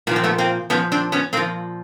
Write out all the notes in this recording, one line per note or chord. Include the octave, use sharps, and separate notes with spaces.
A#2 F3 B3 C4
A3 B3
A#3 C4
A#2 F3 B3 C#4
C4 D4
B3 C#4
A#2 F3 A#3 C4